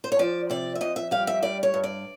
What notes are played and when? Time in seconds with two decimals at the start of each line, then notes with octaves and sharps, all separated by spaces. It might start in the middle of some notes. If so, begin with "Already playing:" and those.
0.04 C5
0.12 C#5
0.19 F3 D5
0.50 C3 D5
0.75 E5
0.81 F2 D#5
0.96 E5
1.11 G3 F5
1.27 E5
1.42 G2 D5
1.63 C#5
1.74 G2
1.84 D5